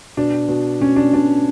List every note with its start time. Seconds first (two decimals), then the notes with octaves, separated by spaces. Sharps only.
0.17 B2 D4
0.49 B2
0.80 B2 C#4
0.96 D4
1.13 B2 D4